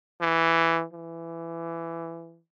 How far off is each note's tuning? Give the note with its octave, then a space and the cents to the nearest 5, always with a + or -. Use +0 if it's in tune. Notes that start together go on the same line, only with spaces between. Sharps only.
E3 +5
E3 +15